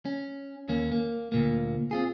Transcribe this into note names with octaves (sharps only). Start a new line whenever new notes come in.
C#4
D#2 A#3 C#4
A#3
D2 A#2 A#3
C4 F4 G#4